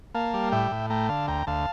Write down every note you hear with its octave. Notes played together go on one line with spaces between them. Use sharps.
A#3 F5 A5
G3
A2 E5 G5
A2
A3 G5 A#5
D3 F5 A5
D2 G5 A#5
D2 F5 A5